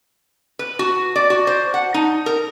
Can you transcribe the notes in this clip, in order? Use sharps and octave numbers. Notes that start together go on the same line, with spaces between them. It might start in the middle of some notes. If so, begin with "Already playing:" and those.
B4
F#4
D5
F#4
C5
F#5
D#4
A#4